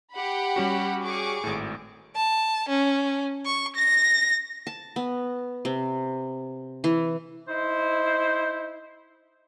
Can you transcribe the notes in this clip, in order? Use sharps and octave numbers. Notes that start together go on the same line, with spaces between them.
G4 F#5 B5
G3 C#4 F#4
G#4 C#6 D6
G#1 A2
A5
C#4
C#6
A#6
A5
B3
C3
E3
D#4 E4 C5